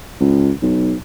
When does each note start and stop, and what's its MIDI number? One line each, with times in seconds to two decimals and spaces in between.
0.20 0.52 37
0.62 0.94 35